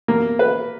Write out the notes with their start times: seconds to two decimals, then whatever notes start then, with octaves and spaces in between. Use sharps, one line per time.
0.08 A#3
0.39 B4